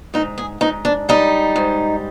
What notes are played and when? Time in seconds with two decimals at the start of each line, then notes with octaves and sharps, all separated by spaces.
0.14 G#2 D#4
0.38 G#4
0.61 G#2 D#4
0.85 D4
1.09 G3 D#4
1.56 G#2